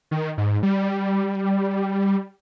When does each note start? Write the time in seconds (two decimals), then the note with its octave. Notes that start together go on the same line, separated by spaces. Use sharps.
0.11 D#3
0.38 G#2
0.63 G3